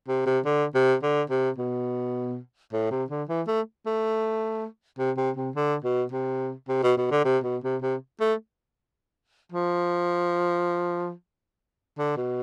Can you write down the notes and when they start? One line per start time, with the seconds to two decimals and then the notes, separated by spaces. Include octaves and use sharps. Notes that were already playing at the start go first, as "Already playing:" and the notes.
0.08 C3
0.26 C3
0.45 D3
0.74 C3
1.03 D3
1.30 C3
1.58 B2
2.73 A2
2.91 C3
3.10 D3
3.29 E3
3.47 A3
3.86 A3
4.98 C3
5.17 C3
5.37 C3
5.56 D3
5.84 B2
6.12 C3
6.69 C3
6.83 B2
6.98 B2
7.11 D3
7.25 C3
7.44 B2
7.64 C3
7.82 C3
8.20 A3
9.52 F3
11.98 D3
12.17 B2